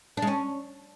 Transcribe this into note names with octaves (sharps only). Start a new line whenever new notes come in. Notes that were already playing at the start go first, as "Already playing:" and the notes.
D4
G#3
C#4